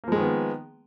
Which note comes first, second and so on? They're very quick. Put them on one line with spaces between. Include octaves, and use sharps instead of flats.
A#3 F3 G#3 D#3 B3